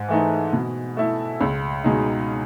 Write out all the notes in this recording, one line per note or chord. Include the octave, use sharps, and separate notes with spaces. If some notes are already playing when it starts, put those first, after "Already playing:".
Already playing: G#2
E3 A3 D#4
B2
A3 E4
C#2
B2 G#3 D#4